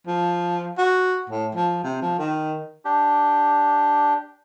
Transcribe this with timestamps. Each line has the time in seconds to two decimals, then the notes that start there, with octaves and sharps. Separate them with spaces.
0.07 F3
0.78 F#4
1.30 A2
1.55 F3
1.84 C3
2.02 F3
2.19 D#3
2.85 D4 G4